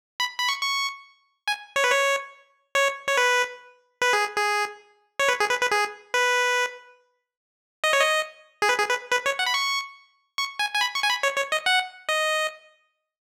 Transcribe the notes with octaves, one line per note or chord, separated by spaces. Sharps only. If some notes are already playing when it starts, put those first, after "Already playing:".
B5
B5
C#6
C#6
G#5
C#5
B4
C#5
C#5
C#5
B4
B4
G#4
G#4
C#5
B4
G#4
B4
B4
G#4
B4
D#5
C#5
D#5
G#4
B4
G#4
B4
B4
C#5
F#5
B5
C#6
C#6
G#5
G#5
B5
C#6
G#5
B5
C#5
C#5
D#5
F#5
D#5